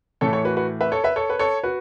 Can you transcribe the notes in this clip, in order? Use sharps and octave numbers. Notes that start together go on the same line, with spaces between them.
A2 E3 A3 A4 C#5
A4 C#5
F#4 B4
F#4 B4
B4 E5
A4 C#5
B4 E5
A4 C#5
B4
A4 C#5
F#4 B4